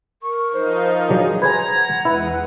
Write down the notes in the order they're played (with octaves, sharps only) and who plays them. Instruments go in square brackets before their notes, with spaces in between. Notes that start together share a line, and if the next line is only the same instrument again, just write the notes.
[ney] A#4 [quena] C#6
[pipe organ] F3 D#4 [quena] C5
[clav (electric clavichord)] F#3 D4 [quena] G#4
[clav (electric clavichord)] B4 C5 G#5 [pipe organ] A#5 [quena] G#6
[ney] F#5
[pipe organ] E2 G#3 [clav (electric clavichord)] E4 [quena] B4